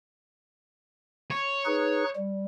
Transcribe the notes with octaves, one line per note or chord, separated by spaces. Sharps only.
C#5
D#4 G#4 B4
G3